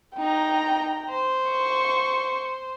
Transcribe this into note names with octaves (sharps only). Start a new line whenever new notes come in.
D#4 G5 A#5
C5
C#6